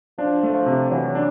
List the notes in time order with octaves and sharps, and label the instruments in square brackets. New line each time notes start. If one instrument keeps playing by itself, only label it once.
[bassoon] F3 [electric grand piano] D4
[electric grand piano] A3
[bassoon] F3
[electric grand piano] C3
[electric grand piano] E3 [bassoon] F#3
[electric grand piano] D4